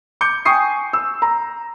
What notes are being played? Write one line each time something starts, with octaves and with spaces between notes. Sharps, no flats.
D6 G6 C#7
G5 G#5 C#6 D#6 C7
E6
A#5